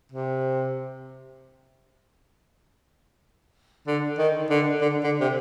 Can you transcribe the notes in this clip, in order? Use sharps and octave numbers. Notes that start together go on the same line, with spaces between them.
C3
D3
D#3
D3
D3
D3
C3